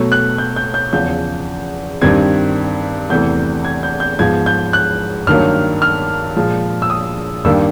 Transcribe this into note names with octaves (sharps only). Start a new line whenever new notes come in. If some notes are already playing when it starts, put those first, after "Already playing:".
Already playing: B2 F#3 A3
F#6
G6
G6
G6
E2 C#3 F3 G6
G2 D#3 G3 C4 G#6
E2 C3 E3 A3 G6
G#6
G6
G6
G#2 F3 G#3 B3 G#6
G6
F#6
G2 D#3 F#3 A#3 F6
F6
A#2 F3 G#3
E6
D#6
G2 D#3 G3 A#3 E6